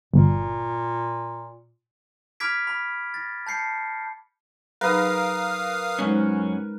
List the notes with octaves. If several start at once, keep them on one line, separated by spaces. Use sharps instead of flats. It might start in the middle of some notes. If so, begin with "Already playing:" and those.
G1 A#2
B5 D6 F6 G#6 B6 D7
B5
A6 A#6
A5 G6 C7 C#7
F#3 D#4 G#4 A#4 B4 F5 D#6
F#2 G#3 C#4 D#4 C5